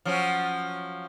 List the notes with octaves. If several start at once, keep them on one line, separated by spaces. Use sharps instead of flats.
F3 F#3 C#4